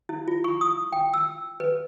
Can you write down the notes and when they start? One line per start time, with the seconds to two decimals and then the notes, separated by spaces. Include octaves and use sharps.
0.09 E4
0.28 F4
0.44 C#6
0.61 D#6
0.92 G5
1.14 E6
1.60 B4